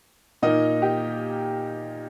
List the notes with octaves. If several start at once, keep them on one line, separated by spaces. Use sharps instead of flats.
A#2 A#3 D#4 D#5
G4